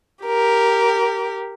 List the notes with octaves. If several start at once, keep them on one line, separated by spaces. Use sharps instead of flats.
G4 A#4